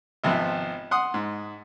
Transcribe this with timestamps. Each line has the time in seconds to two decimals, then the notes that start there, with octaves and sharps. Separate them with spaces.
0.24 G#1 C3 F3 B3
0.91 F#5 C6 D#6
1.14 G#2